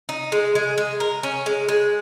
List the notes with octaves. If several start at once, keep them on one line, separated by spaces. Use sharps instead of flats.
D#4
G#3
G#3
G#3
A#4
C#4
G#3
G#3